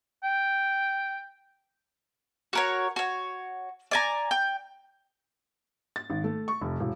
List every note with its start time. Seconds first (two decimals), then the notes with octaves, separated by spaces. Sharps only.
0.23 G5
2.53 F#4 A#4 C#5
2.96 F#4 C#5
3.91 D5 G#5 A#5
4.31 G5
5.96 A6
6.10 G#1
6.24 A3
6.48 C#6
6.61 F1
6.80 E1